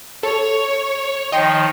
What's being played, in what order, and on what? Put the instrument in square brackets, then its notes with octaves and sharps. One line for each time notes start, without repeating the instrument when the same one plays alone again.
[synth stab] A4 [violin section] C#5
[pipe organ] D#3 F3 D#4 [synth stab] D#5 G5 C6